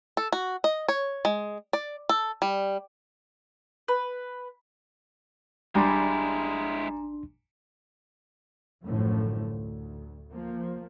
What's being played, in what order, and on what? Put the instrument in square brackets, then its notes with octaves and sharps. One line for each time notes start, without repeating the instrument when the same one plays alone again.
[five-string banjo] A4
F#4
D#5
C#5
G#3
D5
A4
G3
[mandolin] B4
[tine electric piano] G#1 D4 C6 [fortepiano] G3 [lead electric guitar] G#3 E4 [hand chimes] G#5 A#5
[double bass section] A1 F#2 A2 D3 F3 A3
D2
F3 A#3